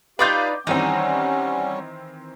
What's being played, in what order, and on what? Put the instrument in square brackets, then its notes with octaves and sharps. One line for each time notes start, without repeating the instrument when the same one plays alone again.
[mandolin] D#4 F4 D5 [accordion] G4 F5 [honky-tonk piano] B4 D6 G6
[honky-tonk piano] D#3 E3 C4 [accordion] G3 C#4 [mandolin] D#4 [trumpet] F#5